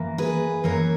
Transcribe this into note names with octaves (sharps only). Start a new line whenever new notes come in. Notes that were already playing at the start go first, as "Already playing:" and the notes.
Already playing: F#2 E3 A#3
G#4 B4
F#2 E3 A#3 A#4 C#5